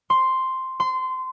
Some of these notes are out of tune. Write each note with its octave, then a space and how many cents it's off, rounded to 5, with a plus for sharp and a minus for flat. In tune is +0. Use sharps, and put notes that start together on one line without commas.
C6 +0
C6 -20